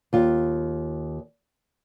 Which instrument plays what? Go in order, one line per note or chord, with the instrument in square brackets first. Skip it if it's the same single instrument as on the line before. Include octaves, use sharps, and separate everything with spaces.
[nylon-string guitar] D#2 F4